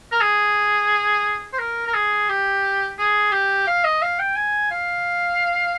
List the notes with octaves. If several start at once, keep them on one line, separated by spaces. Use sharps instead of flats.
A#4
G#4
C5
A#4
A#4
G#4
G4
G#4
G4
F5
D#5
F5
G5
G#5
F5